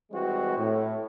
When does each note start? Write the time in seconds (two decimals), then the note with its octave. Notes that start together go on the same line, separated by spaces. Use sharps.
0.12 E3 G3 G#3 C4 F#4
0.57 A2